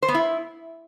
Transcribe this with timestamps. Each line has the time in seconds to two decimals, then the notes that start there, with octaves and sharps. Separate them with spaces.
0.02 C5
0.08 B3
0.14 E4